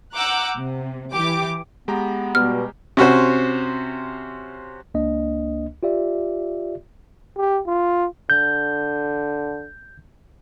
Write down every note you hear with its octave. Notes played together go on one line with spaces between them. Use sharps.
F#5 A#5 D6 E6 F#6 G6
C3
E3 G4 D6
G#3 B3 G4 A#5
B2 G3 F6
C3 C#4 F#4 C5
C#2 A#3 D4 D#5
F4 G4 D5 E5
G4
F4
D3 G6